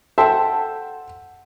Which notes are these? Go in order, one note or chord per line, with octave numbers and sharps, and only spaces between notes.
A4 C5 E5 F#5 G5 A5